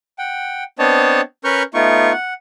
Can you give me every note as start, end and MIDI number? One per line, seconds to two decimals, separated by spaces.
0.19 0.64 78
0.19 0.64 79
0.79 1.21 59
0.79 1.21 60
0.79 1.21 62
0.79 1.21 73
0.79 1.21 75
0.79 1.21 81
1.44 1.63 61
1.44 1.63 70
1.44 1.63 71
1.44 1.63 85
1.44 1.63 89
1.44 1.63 91
1.74 2.12 57
1.74 2.12 59
1.74 2.12 63
1.74 2.12 65
1.74 2.12 85
2.12 2.34 78